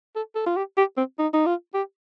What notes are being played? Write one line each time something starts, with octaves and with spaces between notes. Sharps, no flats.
A4
A4
F4
G4
G4
C4
D#4
D#4
F4
G4